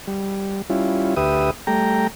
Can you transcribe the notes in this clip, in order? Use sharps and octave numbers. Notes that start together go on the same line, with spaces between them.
G3
G3 C#4 E4 F4
D2 G4 B4 E5 D#6
G3 A3 G5 A#5